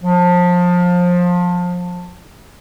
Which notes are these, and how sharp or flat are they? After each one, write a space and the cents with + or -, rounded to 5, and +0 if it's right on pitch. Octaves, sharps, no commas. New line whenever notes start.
F3 +25